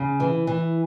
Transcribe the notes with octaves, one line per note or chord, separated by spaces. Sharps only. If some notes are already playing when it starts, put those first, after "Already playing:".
Already playing: C#3
E3
E3